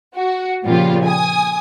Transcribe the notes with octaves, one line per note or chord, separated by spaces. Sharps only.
F#4
A#2 C#3 F3 G3 F4
G#5 D#6